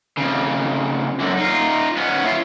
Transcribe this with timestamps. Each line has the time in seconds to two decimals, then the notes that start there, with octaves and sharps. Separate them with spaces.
0.18 F2 C#3
1.20 F#2 D3
1.38 D#4 F4
1.97 B3 C#4
2.25 E4 F4